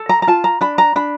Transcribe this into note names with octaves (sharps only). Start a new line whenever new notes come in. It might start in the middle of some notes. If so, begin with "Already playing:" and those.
Already playing: A4
A#5
A#5
F4 A5
A#5
D4 B5
A#5
D4 B5